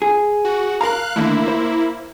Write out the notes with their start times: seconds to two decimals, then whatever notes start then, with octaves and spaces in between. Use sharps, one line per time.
0.02 G#4
0.45 F#4
0.81 A#4 F5 A#5 F#6
1.16 D3 D#3 A3 A#3 E4
1.48 C5